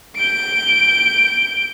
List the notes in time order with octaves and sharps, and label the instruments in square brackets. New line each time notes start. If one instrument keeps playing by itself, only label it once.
[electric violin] G6 D7